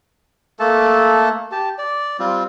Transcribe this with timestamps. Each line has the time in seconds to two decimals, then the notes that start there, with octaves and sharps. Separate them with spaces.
0.59 A3 A#3 A4 A5
1.52 G4 A5
1.78 D5
2.19 G3 C4 F4